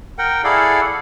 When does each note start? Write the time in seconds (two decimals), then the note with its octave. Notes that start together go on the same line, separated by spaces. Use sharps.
0.19 A#4 F#5 G5
0.44 E4 G#4 A4 D5 F5 F#5